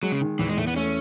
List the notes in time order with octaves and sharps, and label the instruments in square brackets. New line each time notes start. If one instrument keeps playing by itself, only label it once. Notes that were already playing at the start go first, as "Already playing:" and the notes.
[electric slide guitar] F#3 [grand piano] G#3
[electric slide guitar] C#3
[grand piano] D#3
[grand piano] E2 [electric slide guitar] E3
[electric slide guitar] G#3
[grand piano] E2 [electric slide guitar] A3
[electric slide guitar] B3
[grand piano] A3 [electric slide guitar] C#4